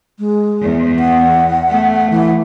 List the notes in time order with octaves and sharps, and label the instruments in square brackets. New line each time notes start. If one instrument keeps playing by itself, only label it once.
[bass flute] G#3
[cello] E2
[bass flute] F#5
[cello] A3
[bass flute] E3